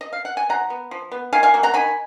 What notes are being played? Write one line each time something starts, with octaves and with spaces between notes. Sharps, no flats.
D#5
F5
F#5
G#5
F3 F#5 A#5
B3
F3
B3
D#3 F5 G#5
F5 G#5
F#3 A#3
F#5 A#5
D#3 G#5 B5